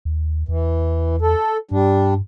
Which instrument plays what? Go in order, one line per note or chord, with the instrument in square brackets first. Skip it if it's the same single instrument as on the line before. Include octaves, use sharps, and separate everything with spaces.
[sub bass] D#2
[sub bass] E2 [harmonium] E3
[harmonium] A4
[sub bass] G2 [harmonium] G3 D4